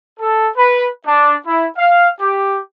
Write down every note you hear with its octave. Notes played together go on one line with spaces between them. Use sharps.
A4
B4
D4
E4
F5
G4